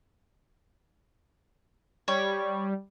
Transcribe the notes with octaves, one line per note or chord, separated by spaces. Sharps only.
G3 C#5